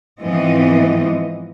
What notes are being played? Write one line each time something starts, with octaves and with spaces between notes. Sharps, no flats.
G#2 E3 F3 B3 C4 D#5